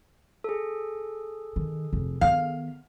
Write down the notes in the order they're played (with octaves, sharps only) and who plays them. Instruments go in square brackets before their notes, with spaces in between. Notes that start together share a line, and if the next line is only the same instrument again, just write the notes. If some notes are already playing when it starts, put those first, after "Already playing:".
[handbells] G#4 A4
[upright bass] D#3
F1
[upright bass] D#3 B3 [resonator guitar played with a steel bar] F5